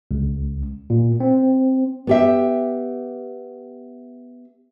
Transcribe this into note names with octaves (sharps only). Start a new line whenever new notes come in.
C#2
A#2
C4
B3 G4 E5